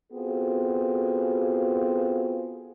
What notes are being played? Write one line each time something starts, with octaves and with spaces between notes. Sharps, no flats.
B3 C4 F4 F#4 G#4 A4